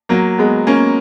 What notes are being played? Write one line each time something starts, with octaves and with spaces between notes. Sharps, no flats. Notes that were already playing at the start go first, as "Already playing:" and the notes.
F#3 A#3
G#3 B3
A#3 C#4